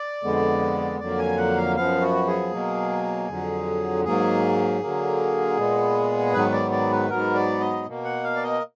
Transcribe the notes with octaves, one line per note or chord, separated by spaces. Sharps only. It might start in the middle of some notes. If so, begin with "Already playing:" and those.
Already playing: D5
F2 D3 G#3 B3
F2 D3 F#3 A#3 D5
G#5
F#5
F5
F#2 F3 B3 F5
F#4
G#4
B2 F#3 A#3
F2 D3 F#3
G#2 F#3 A#3 G#4
D3 F#3 A#3
A#2 G#3 B3
G#2 D#3 F#3 B3 B4
D5
D5
B4
G#2 F#3 B3 A#4
D5
D#5
B2 A#3
F#5
F5
D5
D#5